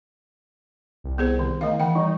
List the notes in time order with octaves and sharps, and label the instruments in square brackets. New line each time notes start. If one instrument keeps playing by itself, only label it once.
[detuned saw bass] C2
[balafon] B3 G#4 C5
D#3
[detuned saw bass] D#3 [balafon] A3 D#5 F5
[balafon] E3 F#5 G5
[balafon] G3 [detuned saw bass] D#4